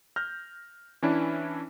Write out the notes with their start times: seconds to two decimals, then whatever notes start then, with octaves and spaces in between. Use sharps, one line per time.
0.16 F6 G6 A#6
1.02 E3 C#4 D4 E4